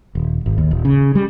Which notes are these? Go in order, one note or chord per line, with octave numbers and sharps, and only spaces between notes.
D#1
G#1
D#2
D#1
C#3
G3